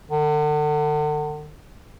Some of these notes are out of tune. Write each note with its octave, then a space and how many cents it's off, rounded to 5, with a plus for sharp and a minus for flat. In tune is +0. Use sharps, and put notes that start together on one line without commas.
D3 +40